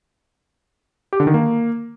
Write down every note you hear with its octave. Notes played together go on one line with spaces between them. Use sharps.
G4
D3
D#3
A#3